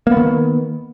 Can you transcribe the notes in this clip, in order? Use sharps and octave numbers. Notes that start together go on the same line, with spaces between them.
D#3 A#3 B3